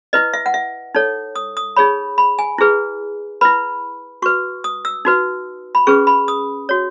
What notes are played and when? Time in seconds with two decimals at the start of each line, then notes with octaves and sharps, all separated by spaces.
0.13 E4 B4 D#5
0.33 E5
0.46 F#5
0.54 E5
0.95 D#4 A4 C#5
1.35 D#6
1.57 D#6
1.76 D#4 G#4 C#5 B5
2.18 B5
2.39 G#5
2.58 E4 G#4 B4
3.41 E4 B4 B5
4.22 F#4 B4 C#6
4.64 D#6
4.85 E6
5.05 D#4 F#4 B4
5.75 B5
5.87 C#4 G#4 B4 C#6
6.07 B5
6.28 D#6
6.69 F#4 C#5